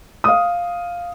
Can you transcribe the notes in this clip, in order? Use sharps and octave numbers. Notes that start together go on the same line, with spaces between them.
F5 D#6